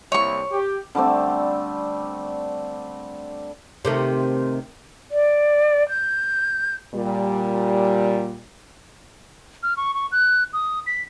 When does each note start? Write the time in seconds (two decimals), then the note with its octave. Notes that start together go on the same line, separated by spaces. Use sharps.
0.12 C2 A#3 E4 C#5 C#6
0.51 G4
0.95 D3 G3 A3 C4
3.85 C3 D#3 A3
5.12 D5
5.89 G6
6.95 A#2 G3
9.63 F6
9.77 C#6
9.94 C#6
10.12 F#6
10.53 D#6
10.87 B6